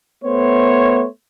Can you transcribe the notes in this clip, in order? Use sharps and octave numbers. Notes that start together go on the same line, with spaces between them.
A3 B3 C5 C#5